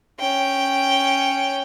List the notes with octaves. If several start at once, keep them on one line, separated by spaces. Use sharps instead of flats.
C#4 G5